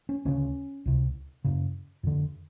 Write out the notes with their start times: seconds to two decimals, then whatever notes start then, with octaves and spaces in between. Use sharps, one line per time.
0.09 C#4
0.25 D2 C#3 C#4
0.86 C#2 C3
1.44 F#2 C#3
2.03 F2 D3